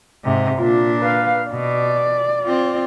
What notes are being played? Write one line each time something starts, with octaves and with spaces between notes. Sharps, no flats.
G#2 C3
A#2 D4 F4
B4 F5
B2 D5
C4 F4